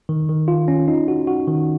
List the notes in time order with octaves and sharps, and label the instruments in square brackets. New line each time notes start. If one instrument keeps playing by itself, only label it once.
[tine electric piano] D#3
D#3
F4
C#4
D#4
F#4
F#4
D#3